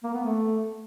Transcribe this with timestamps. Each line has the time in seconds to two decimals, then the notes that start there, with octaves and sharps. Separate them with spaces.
0.03 A#3
0.13 B3
0.23 A3